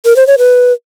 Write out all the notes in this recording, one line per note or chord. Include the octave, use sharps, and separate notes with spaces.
A#4
C5
C#5
B4